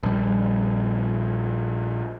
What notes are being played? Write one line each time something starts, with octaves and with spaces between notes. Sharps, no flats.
A#1 G3